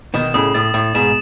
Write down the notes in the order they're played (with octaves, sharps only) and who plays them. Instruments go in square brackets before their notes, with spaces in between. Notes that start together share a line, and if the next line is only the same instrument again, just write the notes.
[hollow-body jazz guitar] B2 D#3 [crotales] E7
[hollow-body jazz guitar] A2 C#3 [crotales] D#6
[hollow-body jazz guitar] A2 [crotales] A6
[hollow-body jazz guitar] A2 [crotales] D#6
[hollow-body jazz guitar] G#2 B2 [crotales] E7